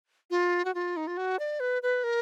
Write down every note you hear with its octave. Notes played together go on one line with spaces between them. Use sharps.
F4
F#4
F4
D#4
F4
F#4
D5
B4
B4
A#4